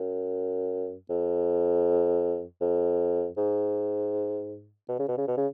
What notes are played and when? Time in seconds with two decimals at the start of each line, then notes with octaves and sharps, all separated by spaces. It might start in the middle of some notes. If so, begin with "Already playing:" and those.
Already playing: F#2
1.10 F2
2.61 F2
3.37 G#2
4.89 B2
4.99 C#3
5.09 B2
5.18 C#3
5.28 B2
5.37 C#3